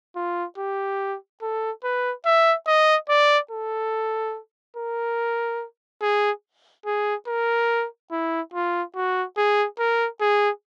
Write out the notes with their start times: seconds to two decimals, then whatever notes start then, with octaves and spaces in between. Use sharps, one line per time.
0.16 F4
0.58 G4
1.42 A4
1.84 B4
2.26 E5
2.67 D#5
3.09 D5
3.51 A4
4.77 A#4
6.02 G#4
6.86 G#4
7.27 A#4
8.12 E4
8.53 F4
8.95 F#4
9.37 G#4
9.79 A#4
10.21 G#4